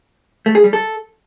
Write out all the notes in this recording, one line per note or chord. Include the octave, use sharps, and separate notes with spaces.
A3
G#4
G3
A4